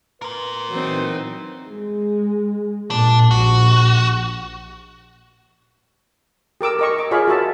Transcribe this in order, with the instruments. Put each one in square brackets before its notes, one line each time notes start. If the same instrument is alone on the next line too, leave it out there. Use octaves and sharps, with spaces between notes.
[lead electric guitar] A#4 C6 [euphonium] B4
[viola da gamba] E3 C4 D#4 [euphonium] F#3
[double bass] G#3
[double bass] A#2 [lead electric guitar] D4
[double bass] A#1 [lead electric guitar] F#4
[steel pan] G4 A#4 D6 E6
A#4 D#5 C#6
D6
F4 G#4 C#5 D#5 F5 B5
F#4 A#4 E5 A5